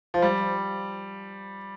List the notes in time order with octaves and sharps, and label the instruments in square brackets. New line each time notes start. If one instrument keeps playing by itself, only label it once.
[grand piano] F3
G3